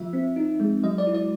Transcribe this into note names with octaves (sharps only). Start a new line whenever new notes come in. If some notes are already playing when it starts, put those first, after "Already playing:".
Already playing: F3 E5
C4
D#4
G#3
F#3 D#5
D5
E4
D5